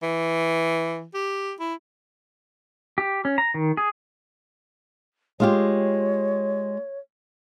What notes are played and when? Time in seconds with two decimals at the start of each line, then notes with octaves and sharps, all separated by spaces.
0.03 E3
1.14 G4
1.60 E4
2.98 G4
3.25 C#4
3.38 A#5
3.54 D#3
3.77 G#4
5.40 G#3 F4 G4 C#5